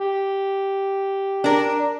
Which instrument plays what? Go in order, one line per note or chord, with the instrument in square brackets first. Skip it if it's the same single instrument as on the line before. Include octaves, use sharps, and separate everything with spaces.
[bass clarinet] G4
[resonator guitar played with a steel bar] D4 A#4